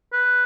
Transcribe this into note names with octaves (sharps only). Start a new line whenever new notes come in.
B4